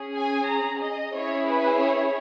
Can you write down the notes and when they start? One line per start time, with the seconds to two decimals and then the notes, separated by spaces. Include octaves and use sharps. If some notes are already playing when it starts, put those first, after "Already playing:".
Already playing: C#4 G#4
0.16 G#5
0.49 A#5
0.82 D#5
1.14 C#4 E4 G#4 C#5
1.48 B4
1.80 C#5